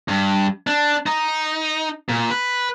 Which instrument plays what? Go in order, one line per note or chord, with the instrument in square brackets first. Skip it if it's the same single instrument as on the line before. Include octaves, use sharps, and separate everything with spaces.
[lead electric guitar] G2
D4
D#4
A#2
B4